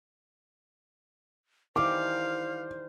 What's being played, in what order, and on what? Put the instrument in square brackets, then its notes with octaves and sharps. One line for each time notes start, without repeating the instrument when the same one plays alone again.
[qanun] D#3 E3 G3 [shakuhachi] C5 [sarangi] F5 [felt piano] D6